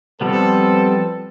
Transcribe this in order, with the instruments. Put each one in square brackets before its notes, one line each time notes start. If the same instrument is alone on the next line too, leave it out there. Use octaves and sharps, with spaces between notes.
[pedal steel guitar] F3 G3 B3 [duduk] C4 [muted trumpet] A4 [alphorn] B4